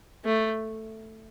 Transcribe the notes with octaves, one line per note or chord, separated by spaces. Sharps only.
A3